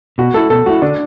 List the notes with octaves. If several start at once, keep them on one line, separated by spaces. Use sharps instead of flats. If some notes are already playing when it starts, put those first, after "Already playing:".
B2 F#4
A3 E4 A4
B2 A4
A3 E4 F#4
D3 D4